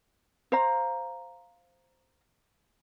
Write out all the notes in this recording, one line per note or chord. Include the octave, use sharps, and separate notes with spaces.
C5 F5 A#5